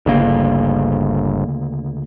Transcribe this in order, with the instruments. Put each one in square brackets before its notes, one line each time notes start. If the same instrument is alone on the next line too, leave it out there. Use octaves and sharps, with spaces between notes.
[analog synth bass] G1 [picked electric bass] D2 C#3 A#3